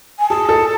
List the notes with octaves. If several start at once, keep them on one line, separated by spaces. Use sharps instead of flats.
G#5
G#4 A5
A4